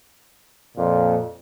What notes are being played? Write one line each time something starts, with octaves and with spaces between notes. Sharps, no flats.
F2 A#2